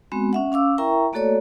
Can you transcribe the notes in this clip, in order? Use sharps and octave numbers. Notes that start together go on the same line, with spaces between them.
G#3 B3 C4 F#4
C#4 E5 F#5
C#4 F5 D6 E6
E4 A#4 E5 G5 A#5 C#6
A3 A#3 F#4 A4 C#5 D5